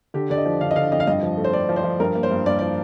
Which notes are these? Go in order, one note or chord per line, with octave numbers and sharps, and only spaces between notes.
D3 G4
D3 D5
D#5
F3
D3 F5
D#5
D3 F5
F2 D#5
F5
G2 D#5
F3
A3
C5
A3 D5
F3
C5
F3
G2 A#4
A#3
C5
G2
G2 D5
F3 D5